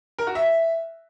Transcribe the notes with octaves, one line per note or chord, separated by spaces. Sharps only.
A#4
F#4
E5